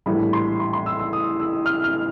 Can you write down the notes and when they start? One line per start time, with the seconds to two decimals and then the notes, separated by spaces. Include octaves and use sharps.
0.06 A#1 A2 E3 G3 B5
0.33 C6
0.60 C6
0.73 C6
0.86 E6
0.99 E6
1.13 D#6
1.40 E6
1.66 F6
1.84 F6